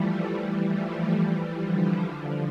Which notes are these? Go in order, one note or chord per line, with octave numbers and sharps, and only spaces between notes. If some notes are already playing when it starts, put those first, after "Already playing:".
Already playing: E3 F3 G3 A3
E3 G3
F3 A3
E3 G3
D3 F3
D3 F3